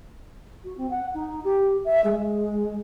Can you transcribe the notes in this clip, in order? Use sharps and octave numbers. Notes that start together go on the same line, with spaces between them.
F#4
C4
F#5
D#4
G4
E5
G#3